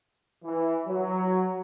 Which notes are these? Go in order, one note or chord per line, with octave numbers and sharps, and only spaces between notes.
E3
F#3